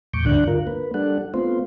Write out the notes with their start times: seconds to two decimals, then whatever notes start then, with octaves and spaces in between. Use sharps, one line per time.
0.14 E2 A2 C#6 D6 G6
0.26 D2 G2 D3 D4 F#6
0.47 F4 A#4
0.67 A#3 B4
0.94 G3 D4 A4 F#5
1.34 A3 B3 C4 F4 C5